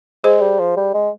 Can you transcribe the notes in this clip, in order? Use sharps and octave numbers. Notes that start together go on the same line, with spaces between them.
G#3 G#4 C5
G3
F3
G3
G#3